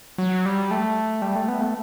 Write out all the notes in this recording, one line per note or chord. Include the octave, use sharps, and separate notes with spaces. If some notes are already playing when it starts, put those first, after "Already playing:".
F#3
G3
A3
G3
A3
B3
A3